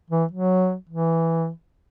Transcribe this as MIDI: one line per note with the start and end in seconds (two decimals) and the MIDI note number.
0.10 0.24 52
0.32 0.75 54
0.89 1.49 52